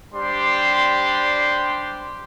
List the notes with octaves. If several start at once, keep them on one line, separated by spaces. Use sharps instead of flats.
G3 D4 G4 C5 C6